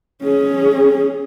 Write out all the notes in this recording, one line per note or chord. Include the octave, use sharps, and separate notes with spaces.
C#4 G#4